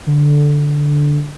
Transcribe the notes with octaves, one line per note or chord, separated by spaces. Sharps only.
D3